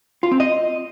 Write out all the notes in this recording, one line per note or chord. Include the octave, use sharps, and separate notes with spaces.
F4
C4
D#5